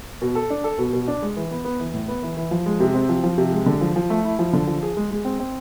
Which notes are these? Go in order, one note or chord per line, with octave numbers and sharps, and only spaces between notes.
B2
A4
D4
A4
B2
B2
D4
G#3
E3
B3
B3
E3
A2
B3
E3
E3
F3
G#3
C3
C4
F3
F3
C3
G#3
D3
F3
F3
A3
E4
F3
D3
F3
G#4
G#3
G#3
C4
C4